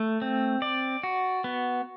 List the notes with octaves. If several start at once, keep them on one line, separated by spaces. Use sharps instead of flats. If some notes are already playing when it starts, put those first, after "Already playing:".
Already playing: A3
C4
D5
F#4
B3